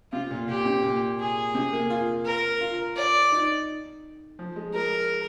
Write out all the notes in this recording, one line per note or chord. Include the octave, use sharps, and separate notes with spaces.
C3 F4
A#2
A#2 G4
C3
A#2
G#4
C3
A#3
F4
A#4
F4
D5
D#4
F3
G#3
G#3 A#4